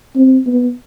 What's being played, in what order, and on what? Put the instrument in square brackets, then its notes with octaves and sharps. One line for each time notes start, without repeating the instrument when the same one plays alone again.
[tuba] C4
B3